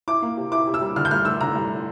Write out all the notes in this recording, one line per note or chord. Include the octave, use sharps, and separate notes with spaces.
E4 D6
A#3
C3
E4 D6
C3
E6
G3
D3 F6
G6
G2 F6
A3 E6
D3 A#5
G2